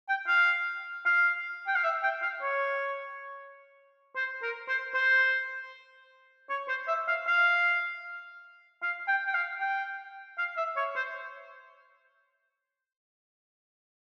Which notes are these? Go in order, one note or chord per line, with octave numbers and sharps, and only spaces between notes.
G5
F5
F5
G5
F5
E5
G5
F5
C#5
C5
A#4
C5
C5
C#5
C5
E5
F5
F5
F5
G5
G5
F5
G5
F5
E5
C#5
C5